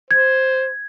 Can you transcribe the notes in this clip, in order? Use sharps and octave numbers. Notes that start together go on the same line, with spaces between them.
C5 G#6